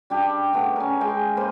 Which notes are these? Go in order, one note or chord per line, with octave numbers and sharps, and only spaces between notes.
G3 D4 G4
D3 A3 B3
C#4 A#4
G#3 G5
A#3 B4 C5